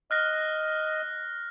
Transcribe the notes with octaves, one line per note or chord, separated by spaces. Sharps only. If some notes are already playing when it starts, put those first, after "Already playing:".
D#5 F6 F#6 A#6